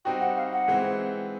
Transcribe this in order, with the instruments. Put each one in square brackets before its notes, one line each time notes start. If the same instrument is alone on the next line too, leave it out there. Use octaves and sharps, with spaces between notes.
[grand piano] G3 C4 D#4 F#4 [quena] G5
[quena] F#5
F5
F#5
[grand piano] E3 G#3 C4